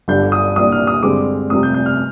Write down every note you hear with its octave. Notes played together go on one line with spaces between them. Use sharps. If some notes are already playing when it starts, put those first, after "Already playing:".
G1 G2 D3 G3 D4 G6
D#6
C2 A#2 G3 D4 D#6
F6
D#6
G2 D3 G#3 C4 D6
F1 F2 C3 G3 D#6
G6
G6
F6